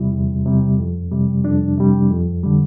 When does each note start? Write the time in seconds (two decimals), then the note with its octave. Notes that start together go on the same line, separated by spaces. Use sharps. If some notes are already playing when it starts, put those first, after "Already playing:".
Already playing: E2 C3 G3 E4
0.14 E2
0.46 C3 G3
0.79 F2
1.12 C3 G3
1.45 F2 D4
1.77 C3 G3
2.10 F2
2.44 D3 G3